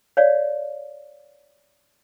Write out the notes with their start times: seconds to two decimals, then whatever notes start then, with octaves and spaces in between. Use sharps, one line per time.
0.17 C#5 D5 F5